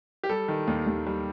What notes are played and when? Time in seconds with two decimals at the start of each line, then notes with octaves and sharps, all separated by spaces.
0.24 G4
0.29 G3 A4
0.48 D#3
0.68 D#2
0.87 D#2
1.06 G3